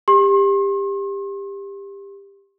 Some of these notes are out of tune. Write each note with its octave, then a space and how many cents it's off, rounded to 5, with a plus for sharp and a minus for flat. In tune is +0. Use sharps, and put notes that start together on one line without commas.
G4 +20 C6 +45